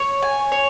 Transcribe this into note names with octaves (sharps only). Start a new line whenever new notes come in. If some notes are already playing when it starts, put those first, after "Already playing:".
Already playing: C#5
G#5
C#5